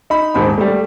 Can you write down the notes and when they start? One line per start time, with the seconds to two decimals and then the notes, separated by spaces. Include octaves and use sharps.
0.10 D#4 B5
0.34 D#1 G#2 C4 B5
0.58 G3 A3